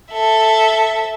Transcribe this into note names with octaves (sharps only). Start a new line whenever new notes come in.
A4 E5